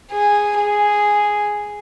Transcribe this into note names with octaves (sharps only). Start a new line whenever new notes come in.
G#4
G#4